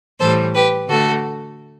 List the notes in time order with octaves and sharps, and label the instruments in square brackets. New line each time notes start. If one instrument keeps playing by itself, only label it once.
[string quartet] A2 E3 G3 A4 C5
G4 B4
D3 A3 F#4 A4